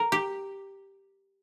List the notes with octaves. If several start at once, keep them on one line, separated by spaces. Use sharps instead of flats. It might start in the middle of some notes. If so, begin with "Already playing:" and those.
Already playing: A#4
G4